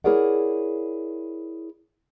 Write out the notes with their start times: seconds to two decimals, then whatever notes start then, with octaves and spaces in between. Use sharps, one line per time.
0.04 E4 G#4 A#4 C#5 D5 F#5